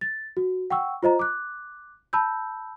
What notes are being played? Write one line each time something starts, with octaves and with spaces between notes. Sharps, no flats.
A6
F#4
F#5 G5 C#6 E6
F4 C5 D#5 A#5
D6 F#6
A5 B5 E6 G6